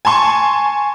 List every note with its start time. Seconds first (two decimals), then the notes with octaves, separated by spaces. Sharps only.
0.05 G#5 A5 C6 C#6